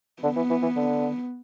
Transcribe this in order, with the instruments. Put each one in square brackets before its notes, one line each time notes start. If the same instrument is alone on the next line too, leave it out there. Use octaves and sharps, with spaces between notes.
[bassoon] D3 [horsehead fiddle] B3
[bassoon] E3
E3
E3
D3